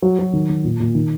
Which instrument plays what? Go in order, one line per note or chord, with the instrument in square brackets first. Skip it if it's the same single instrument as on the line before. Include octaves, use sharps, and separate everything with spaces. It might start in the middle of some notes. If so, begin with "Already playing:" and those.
[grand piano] F#3
F#3
D#3
D#3
A#2
A#2
D#3